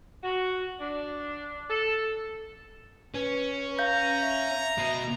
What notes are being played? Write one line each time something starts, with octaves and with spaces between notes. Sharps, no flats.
F#4
D4
A4
C#4 B4
F5 A#5 G6
E5
B2